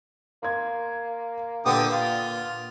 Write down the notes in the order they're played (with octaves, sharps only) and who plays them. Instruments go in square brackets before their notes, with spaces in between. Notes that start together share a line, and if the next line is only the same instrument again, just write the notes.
[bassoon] A#3 [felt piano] C6 G#6
[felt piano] A#2 B4 F#5 [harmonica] D3 G4 D#6
[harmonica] F4